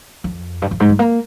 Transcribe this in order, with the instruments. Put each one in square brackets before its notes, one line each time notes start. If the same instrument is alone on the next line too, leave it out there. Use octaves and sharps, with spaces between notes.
[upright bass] F2
G2
F2
G#2
G3
A#3